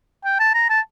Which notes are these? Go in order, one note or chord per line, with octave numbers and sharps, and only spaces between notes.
G5
A5
A#5
A5